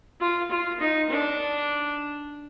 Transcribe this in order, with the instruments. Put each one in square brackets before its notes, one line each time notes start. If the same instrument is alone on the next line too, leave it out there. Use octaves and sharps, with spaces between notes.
[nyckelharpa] F4
F4
D#4
D4